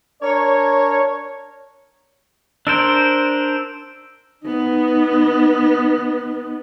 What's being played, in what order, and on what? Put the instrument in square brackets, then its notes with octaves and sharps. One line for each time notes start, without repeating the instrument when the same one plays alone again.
[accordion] D4 A#4 [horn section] C#5
[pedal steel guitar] D4 A#4 C5 [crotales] E6 D7
[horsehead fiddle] B3 D#4